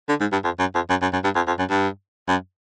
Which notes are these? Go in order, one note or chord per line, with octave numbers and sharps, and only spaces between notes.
D3
G#2
G2
F2
F#2
F2
F#2
F#2
F#2
G2
F2
F2
F#2
G2
F#2